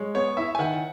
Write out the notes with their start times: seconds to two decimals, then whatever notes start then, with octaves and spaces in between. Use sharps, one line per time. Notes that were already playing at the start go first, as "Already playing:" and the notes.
Already playing: G#3 C#5
0.15 B3 C#5
0.37 E4 E5
0.55 G#5
0.59 D#3 F#5